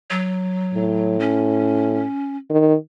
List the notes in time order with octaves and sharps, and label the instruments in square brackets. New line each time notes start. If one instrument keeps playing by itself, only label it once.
[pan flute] F#3
[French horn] A2
[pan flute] C#4
[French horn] D#3